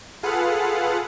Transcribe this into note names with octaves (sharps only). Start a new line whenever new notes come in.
F4 G#4 A4 B4 F5 F#5